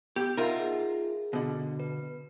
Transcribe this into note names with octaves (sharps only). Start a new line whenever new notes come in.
B3 G4
D#4 F4 A#4 E5 F#5
G#4
B2 D3
B4